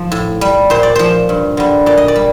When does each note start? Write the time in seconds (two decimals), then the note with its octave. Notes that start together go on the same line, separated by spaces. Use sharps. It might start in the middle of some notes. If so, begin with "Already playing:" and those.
Already playing: F3
0.12 A2
0.41 G3
0.70 A#2 C5
0.83 D5
0.95 F3 C5
1.29 G2
1.57 D3 G3
1.86 A#2 D5
1.97 D#5
2.08 D5
2.16 G3